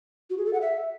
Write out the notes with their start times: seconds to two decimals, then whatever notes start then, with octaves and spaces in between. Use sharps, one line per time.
0.30 F#4
0.38 G#4
0.46 A4
0.53 F#5
0.61 E5